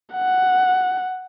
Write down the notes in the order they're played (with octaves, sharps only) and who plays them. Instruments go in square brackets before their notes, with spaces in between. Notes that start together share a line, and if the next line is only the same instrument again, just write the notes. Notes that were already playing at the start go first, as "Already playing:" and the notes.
[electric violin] F#5